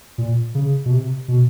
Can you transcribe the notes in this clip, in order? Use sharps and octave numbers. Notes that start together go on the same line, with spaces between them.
A#2
C#3
B2
C3
B2